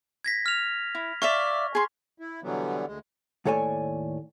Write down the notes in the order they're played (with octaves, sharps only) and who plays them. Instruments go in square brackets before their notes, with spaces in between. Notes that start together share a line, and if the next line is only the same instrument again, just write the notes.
[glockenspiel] G#6 A#6 B6
F6 F7
[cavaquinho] E4
[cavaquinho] D5 E5 F5 [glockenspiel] C#6
[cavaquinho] G#4 C6
[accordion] E4
B2 D3 E3 F#3 G3 B3
D2 G#3
[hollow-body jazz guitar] D#2 A2 A4 C#5 D5 G#5